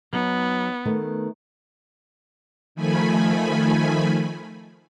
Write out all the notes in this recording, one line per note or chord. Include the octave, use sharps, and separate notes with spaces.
F#3 B3 D#4
D#3 A3 B3
D#3 F3 A3 G#5 B5